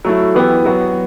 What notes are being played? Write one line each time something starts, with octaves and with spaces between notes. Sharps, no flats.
F#3 A3 E4
E3 B3 E4 G4
F#3 B3 F#4